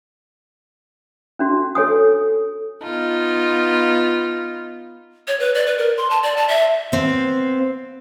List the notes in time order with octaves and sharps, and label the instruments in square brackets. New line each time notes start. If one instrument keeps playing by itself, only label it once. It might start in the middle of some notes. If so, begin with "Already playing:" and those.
[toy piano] C#4 D4 F#4
A4 C#5 G#5 D#6
[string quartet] B3 D#4 F4
[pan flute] C#5
B4
D5
B4
A#4
C6
A5
D5
A5
E5
[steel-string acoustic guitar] B3 C4 F5